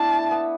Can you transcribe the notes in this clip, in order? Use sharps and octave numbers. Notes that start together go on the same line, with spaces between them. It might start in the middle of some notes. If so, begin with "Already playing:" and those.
Already playing: A3 B3 D4 E4 A5
B3